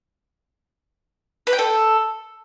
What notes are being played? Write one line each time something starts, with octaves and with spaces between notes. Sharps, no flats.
B4
G5
A4